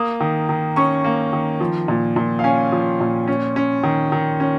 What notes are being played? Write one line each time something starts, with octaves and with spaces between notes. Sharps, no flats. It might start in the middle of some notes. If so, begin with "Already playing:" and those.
Already playing: A#3 D#6
D#3
D#3
C#4 C#6
A#3
D#3
F3
A#2
A#2
F5
C#4 G#5
F3
A#2
C#4
C#4
D#3
D#3
C#4